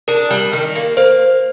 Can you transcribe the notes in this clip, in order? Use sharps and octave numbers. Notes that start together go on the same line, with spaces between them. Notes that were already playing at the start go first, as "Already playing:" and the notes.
D4 A#4
G3
D#3
A#3
A#3 C5